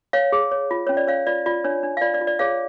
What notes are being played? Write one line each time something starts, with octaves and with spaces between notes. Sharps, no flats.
C#5 F5
G#4
C#5
F4
C#4 C#5
D5
C#4 C#5 F5
F4 D5
F4 D5
D4 C#5
D4
F5
F4 D5
D5
F4
D5
G#4 C#5 F5